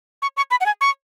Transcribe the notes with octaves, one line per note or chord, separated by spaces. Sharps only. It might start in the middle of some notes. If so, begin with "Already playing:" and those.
C#6
C#6
B5
F#5
G#5
C#6